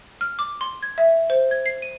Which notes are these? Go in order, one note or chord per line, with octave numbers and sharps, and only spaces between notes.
F6
D6
C6
G#6
E5
C5
G#6
C7
D#7